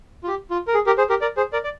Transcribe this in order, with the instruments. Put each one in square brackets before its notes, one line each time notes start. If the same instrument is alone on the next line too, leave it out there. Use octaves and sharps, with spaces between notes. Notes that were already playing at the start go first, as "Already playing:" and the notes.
[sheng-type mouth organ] F4
G4
F4
A#4
G#4
G4 A#4
G#4 C5
G4 A#4
A#4 D5
G#4 C5
A#4 D5
D5